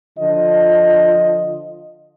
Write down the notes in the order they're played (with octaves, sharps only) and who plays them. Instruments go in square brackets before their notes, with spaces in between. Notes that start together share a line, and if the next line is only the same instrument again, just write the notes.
[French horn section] D3 F3 F4 D#5